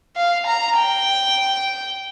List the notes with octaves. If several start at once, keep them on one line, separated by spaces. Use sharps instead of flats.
F5
A#5
G5